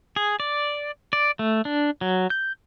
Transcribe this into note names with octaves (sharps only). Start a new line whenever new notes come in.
G#4
D5
D5
A3
D4
F#3
G6